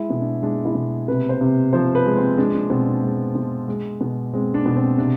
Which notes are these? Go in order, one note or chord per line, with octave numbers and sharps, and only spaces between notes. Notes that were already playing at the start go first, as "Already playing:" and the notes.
Already playing: G#3 E4
B2
D4
G#3 D4
E4
B2
C3 B4
C5
C3
F3 C5
B4
G#3
C4
G#3 D4
D4
B2 C4
D4
G#3
B2
G#3
B2
G#3 C4
D4
B2
C4
C3 D4